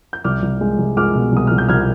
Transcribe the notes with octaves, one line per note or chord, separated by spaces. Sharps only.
G6
C2 D6 F6
C2
G#3
C2
G#3 D6 F6
B2
C2 D#6
C2 F6
G6
C2 F6 G#6